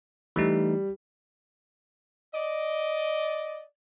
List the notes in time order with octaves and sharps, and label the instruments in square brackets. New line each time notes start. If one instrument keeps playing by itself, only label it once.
[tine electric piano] E3 A3 D#4 [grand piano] G3
[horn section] D5 D#5